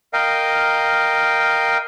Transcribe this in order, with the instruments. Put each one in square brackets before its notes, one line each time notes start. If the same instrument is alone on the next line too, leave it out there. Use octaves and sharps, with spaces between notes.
[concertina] A#4 D#5 F5 G5